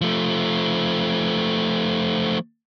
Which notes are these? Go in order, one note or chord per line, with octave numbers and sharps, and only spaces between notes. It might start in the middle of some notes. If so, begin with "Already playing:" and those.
F3 A3